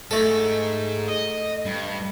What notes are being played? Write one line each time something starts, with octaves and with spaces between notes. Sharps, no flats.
G#2 A3 A4
D#5
G2